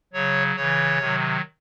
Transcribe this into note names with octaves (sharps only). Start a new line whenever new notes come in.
C#3 F#3 C#5
C#3 E3 C#5
C3 D#3 F#3